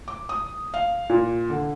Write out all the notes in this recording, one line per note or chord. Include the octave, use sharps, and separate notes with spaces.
D6
D#6
F5
A#2
D3